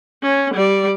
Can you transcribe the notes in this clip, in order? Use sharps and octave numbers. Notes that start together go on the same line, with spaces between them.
C#4
G3 D5